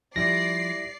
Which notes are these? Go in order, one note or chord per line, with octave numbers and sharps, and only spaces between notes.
F3 G3 E4 D5 A#6 C7